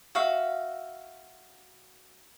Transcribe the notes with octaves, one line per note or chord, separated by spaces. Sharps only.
F#4 E5 F5